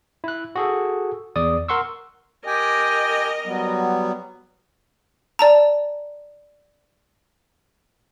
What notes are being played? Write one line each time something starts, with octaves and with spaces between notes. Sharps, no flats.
E4 F#6
F#4 G#4 A4
E2 D5 D#6
A#4 F#5 C6 C#6 E6
G4 A#4 D#5 G5 G#5
F#3 G3 B3
D5 A5 A#5